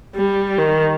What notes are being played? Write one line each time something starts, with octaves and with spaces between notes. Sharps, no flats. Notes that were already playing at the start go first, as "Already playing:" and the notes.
G3
D#3